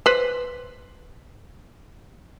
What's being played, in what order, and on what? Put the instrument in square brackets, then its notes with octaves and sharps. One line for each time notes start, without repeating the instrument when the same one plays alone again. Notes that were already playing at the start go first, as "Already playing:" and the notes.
[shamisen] B4 C5